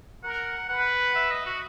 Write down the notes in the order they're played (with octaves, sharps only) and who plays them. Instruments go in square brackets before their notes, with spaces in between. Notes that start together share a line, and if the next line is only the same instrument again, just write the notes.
[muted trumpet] A#4 [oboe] F#5
[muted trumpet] B4 [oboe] F#5
[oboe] E5
D#5
F#4